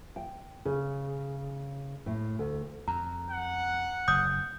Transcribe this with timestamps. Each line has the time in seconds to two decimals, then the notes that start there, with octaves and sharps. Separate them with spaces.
0.16 G5
0.65 C#3
2.06 A2
2.39 D2
2.88 F2 A#5
3.30 F#5
4.08 F#1 D#6 G6